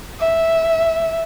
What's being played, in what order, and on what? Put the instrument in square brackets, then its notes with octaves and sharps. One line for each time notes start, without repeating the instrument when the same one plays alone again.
[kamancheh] E5